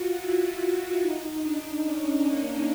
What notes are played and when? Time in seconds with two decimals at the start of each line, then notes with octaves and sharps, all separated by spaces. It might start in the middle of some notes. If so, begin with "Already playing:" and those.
Already playing: F4 F#4
0.17 E4
1.00 D#4
1.41 D4
1.83 C#4
2.24 A#3